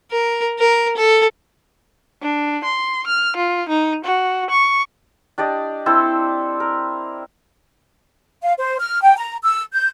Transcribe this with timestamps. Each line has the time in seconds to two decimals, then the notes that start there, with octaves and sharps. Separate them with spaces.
0.12 A#4
0.59 A#4
0.97 A4
2.22 D4
2.64 C6
3.07 F6
3.36 F4
3.69 D#4
4.04 F#4
4.50 C#6
5.38 D4 G4 D5 D#5
5.86 C4 E4 A4 C5
6.60 A#4
8.42 F5
8.59 C5
8.80 F6
9.02 G5
9.18 A#5
9.44 E6
9.73 G6